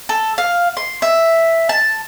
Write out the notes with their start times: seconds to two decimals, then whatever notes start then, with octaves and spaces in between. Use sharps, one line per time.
0.09 A4
0.38 F5
0.77 C6
1.02 E5
1.69 A5